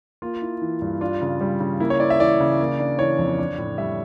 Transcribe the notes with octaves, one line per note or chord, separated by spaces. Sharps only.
A#3 F4
E4
E3
G2
D4 F4
C#3
G3
C#3
A#3 E4
C#5
E4 D5
E5
E3 D5
C#3
A#3
D4
E3 C#5
F2
D4
A2
G3 E5